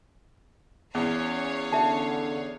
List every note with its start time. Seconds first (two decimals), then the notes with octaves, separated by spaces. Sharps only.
0.95 E2 C#4 C#5 F5
1.72 D3 E5 A5